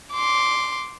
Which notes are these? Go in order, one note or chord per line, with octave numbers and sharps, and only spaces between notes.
C6 D6